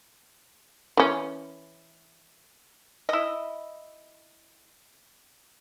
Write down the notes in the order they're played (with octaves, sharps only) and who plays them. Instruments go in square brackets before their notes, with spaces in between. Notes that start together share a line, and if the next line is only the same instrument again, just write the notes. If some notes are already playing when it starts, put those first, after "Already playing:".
[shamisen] E3 C#4
[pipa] E4 D#5